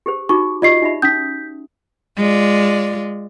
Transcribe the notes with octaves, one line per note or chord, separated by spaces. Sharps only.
G4 G#4 C5
D#4 F#4 C#6 D6
F4 G4 D5 D#5 C7
D#4 E5 B5
C#4 D#4 D#6 G6 B6
G#3 F4 D5